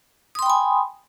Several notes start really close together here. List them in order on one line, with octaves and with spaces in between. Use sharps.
D#6 C6 G5 B5 G#5